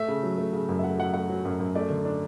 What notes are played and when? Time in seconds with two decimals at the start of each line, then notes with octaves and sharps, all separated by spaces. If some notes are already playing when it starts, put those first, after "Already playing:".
Already playing: A3 E5
0.08 C#3
0.23 F#3
0.38 A3
0.53 C#3
0.69 F#2
0.79 E5
0.84 A3 F#5
0.98 F#3 F#5
1.14 A3 F#5
1.30 F#3
1.45 F#2
1.60 F#2
1.75 A3 D5
1.90 D3
2.05 D4